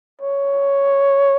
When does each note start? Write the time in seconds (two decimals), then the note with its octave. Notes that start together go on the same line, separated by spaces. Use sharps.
0.21 C#5